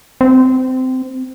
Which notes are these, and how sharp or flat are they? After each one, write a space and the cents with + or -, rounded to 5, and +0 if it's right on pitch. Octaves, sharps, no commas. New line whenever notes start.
C4 -20